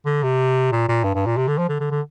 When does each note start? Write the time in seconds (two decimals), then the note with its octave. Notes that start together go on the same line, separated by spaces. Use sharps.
0.06 D3
0.23 C3
0.72 A#2
0.89 A#2
1.04 G2
1.15 G2
1.26 A#2
1.37 C3
1.48 D3
1.58 F3
1.69 D3
1.81 D3
1.91 D3